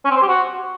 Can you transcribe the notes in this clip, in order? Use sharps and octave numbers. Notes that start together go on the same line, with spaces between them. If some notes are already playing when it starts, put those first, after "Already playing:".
C#4
C4
C5
G4
F#4